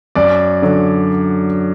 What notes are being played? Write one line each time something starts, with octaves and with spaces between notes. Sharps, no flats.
F#2 D5
D3 F#3